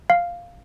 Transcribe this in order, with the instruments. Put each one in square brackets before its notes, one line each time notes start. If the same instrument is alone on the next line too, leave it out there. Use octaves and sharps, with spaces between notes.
[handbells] F5